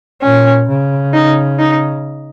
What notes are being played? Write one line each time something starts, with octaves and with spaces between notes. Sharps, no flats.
A#2 C#4
C#3
D#4
D#4